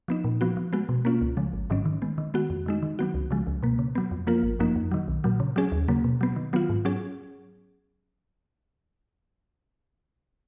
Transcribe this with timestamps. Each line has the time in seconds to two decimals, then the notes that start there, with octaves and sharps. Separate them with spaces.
0.08 F3 B3 D#4
0.24 A#2
0.41 F3 B3 F#4
0.57 F3
0.73 G#3 B3 F#4
0.89 B2
1.05 A#3 C#4 F4
1.21 C#2
1.37 C#3 F3 G#3
1.53 G#1
1.70 G#2 D#3 F#3 C#4
1.86 D#3
2.02 G#3 B3
2.18 D#3
2.34 G#3 B3 F#4
2.50 F2
2.66 D#3 G#3 D#4
2.83 D#3
2.99 F#3 B3 F#4
3.14 C#2
3.31 C#3 F3 G#3
3.47 C#2
3.63 B2 A#3
3.79 C#3
3.95 F#3 B3
4.11 F2
4.27 F3 A#3 F4 A#4
4.43 G#1
4.59 F#2 F3 A#3 D#4
4.76 F2
4.91 D#3 F#3
5.08 B1
5.24 A#2 F#3
5.40 C#3
5.56 F#3 C#4 G#4
5.72 D#2
5.88 C#3 F#3 A#3
6.04 B2
6.21 F#3 B3
6.36 D#3
6.53 F#3 B3 F4
6.69 G#2
6.85 F#3 C#4 G#4